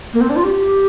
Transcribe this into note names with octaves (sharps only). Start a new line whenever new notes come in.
A#3
C4
D4
F4
G4